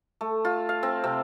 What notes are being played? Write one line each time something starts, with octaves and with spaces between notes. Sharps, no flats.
A3
F4
F5
C4
C3